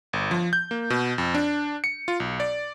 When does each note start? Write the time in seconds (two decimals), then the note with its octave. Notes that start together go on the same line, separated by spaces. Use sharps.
0.13 G1
0.31 F3
0.53 G6
0.71 A#3
0.90 B2
1.18 F2
1.35 D4
1.84 C#7
2.08 F4
2.20 B1
2.40 D5